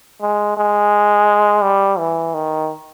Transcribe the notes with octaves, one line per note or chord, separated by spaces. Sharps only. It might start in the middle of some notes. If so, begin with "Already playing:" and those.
G#3
G#3
G3
E3
D#3